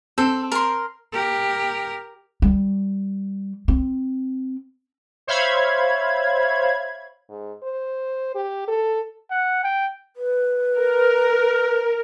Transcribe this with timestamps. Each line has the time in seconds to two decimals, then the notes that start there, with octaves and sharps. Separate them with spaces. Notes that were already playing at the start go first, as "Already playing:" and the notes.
0.18 C4 A4
0.52 A#4 C6
1.13 G4 A#4
2.42 G3
3.68 C4
5.27 C5 C#5 E5 F5 B5 G#6
7.29 G#2
7.63 C5
8.35 G4
8.67 A4
9.30 F#5
9.63 G5
10.16 B4
10.77 A#4